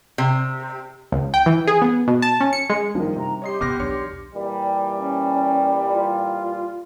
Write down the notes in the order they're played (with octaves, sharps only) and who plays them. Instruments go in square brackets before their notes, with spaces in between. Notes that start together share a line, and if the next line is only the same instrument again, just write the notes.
[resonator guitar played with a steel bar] C3
[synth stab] C#2
G5
E3
G#4
B3
B2
A5
C#4
C#7
G#3
[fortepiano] D#3 F3 [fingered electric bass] G3 D4
[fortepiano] C3 [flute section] A#5
[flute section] G4 C6 [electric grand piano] C#5 D#5 C7
[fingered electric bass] E1 A1 C3 [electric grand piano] B3 F6 A#6 [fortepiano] D6
[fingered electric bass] B1 E2 [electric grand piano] D4 C#5 C#7
[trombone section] A#2 E3 G3
[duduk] C#4
F4